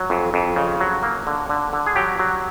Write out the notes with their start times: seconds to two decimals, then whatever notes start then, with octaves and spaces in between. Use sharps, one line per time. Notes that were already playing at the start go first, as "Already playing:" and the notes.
Already playing: F#3
0.10 F2
0.34 F2
0.56 C#3
0.80 F#3
1.03 A#3
1.27 D3
1.49 D3
1.73 D3
1.86 G#4
1.96 F#3 G4
2.19 F#3